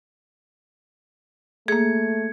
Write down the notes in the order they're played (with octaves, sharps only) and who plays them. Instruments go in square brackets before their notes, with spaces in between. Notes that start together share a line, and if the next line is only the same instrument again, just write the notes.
[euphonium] A3 [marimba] A#3 G#4 [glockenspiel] G#6 C#7